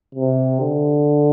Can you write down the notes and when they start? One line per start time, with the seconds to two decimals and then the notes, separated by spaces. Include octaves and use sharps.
0.15 C3
0.61 D3